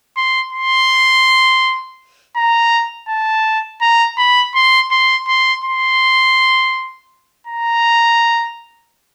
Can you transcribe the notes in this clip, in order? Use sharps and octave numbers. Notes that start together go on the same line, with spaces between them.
C6
C6
A#5
A5
A#5
B5
C6
C6
C6
C6
A#5